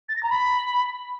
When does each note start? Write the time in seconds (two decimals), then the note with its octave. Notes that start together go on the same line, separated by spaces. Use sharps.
0.09 A6
0.16 A#6
0.23 A#5
0.30 B5